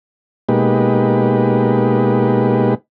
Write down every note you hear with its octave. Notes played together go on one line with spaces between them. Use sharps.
B2 G#3 A#3 D#4 G4 B4